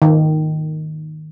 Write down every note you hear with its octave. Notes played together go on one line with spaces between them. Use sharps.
D#3